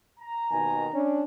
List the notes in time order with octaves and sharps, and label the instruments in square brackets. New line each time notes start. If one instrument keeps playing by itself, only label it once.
[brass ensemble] A#5
[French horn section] D#2 B2 D#3 [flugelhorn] G#5
[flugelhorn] C#4 [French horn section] D4